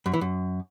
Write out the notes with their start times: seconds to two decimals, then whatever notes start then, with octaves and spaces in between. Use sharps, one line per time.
0.06 F#2
0.14 E3
0.21 F#2